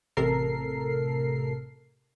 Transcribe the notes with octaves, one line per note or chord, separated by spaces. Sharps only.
A1 C3 A4 A#4 C7